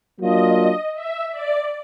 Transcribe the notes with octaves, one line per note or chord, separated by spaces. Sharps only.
F#3 A#3 D4 F4 D#5
E5
D5